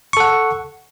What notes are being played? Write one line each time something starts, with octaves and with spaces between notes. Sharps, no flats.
A4 F#5 C#6